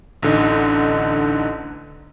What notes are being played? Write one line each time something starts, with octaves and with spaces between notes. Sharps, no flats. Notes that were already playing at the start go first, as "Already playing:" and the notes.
A1 D3 D#4